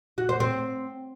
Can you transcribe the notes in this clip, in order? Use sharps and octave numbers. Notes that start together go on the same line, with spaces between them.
F#4
C5
C4